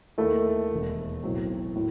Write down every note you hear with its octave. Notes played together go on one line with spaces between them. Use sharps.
D#2 D#3 A3 E4 A4
E1 D#2 D#3
B1 A2 F#3 C4
A2